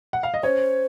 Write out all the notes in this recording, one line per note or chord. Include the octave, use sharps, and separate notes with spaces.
F#5
F5
D#5
C#4 C5 C#5